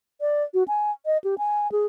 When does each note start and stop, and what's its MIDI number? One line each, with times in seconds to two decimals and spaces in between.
0.21 0.43 74
0.54 0.63 66
0.68 0.91 80
1.06 1.18 75
1.24 1.35 67
1.38 1.70 80
1.72 1.86 68